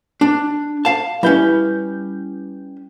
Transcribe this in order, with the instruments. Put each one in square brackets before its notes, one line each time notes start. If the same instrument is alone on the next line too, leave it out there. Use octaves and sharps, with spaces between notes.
[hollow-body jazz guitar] D4
F5 A5
[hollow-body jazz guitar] G3 C#4 [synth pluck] E4 B4 G6